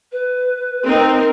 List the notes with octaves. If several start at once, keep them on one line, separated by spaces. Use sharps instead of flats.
B4
C4 D#4 A#4